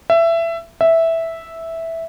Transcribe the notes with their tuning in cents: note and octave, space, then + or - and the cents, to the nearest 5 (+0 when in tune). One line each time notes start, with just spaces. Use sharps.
E5 +20
E5 -5